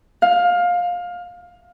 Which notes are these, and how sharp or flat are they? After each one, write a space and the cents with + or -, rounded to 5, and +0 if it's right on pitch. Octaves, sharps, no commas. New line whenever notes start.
F5 +20